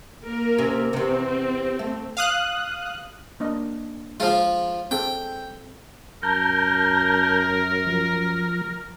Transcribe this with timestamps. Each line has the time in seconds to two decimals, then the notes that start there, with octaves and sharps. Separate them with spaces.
0.24 A#3 A#4
0.58 C3 C#4
0.93 E2 C3 C4
1.79 A3
2.17 F5 D#6 F#6
3.40 A#3 D4 D#5
4.20 F3 G#3 F4 G#4 F5
4.91 C4 G#4 A4 G5
6.23 F#2 A#4 A5 A#5 G6
7.87 F3